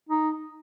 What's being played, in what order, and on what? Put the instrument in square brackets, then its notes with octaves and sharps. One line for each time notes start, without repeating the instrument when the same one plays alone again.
[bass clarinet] D#4